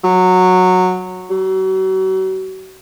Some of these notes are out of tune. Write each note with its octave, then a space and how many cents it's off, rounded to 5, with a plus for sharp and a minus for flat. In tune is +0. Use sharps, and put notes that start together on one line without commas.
F#3 -10
F#3 +40